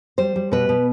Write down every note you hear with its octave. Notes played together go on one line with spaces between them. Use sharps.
G3 C5
G3
B2 B4
B2